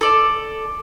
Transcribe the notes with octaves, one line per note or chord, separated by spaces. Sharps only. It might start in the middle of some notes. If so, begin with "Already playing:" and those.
A4 D5